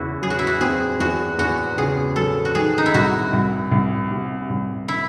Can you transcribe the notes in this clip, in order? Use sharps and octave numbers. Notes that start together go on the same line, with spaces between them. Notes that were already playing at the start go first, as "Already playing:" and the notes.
Already playing: E2 C#3 E4 F#4
F#3 G#4
F#4
E4
F#4
C4 G#4
E2 F#4
E2 F#4
C#3 G#4
F#3 A4
F#4
D#3 G#4
D#4
E4
C2 F#4
C2
C2
C3
C2
E4